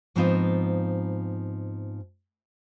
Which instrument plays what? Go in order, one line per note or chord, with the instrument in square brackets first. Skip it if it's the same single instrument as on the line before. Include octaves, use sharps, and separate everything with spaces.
[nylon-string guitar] G#2 F3 B3 C4 D#4 F4